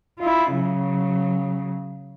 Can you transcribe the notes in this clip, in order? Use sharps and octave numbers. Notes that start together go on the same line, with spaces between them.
E4 F4
C#3 F#3